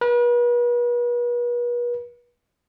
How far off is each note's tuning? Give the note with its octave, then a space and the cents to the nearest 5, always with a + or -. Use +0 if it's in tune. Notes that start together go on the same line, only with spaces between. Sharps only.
B4 -40